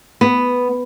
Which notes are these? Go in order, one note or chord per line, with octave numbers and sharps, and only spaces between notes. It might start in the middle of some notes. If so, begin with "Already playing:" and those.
B3